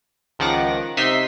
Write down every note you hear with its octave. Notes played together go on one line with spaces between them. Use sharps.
C#2 D#3 F3 F#5 D6 A#6
C3 D#4 E5 C6 B6